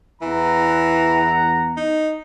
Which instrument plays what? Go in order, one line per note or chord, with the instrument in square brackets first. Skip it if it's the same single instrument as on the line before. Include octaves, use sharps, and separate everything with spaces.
[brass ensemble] E2 F#5 A#5 [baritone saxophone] E3
[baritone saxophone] D#4